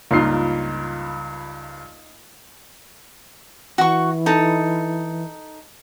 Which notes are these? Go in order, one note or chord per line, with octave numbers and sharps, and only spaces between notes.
C#2 G2 A#3 D#4 F4 C7
E3 F#4 C#6
D#4 A4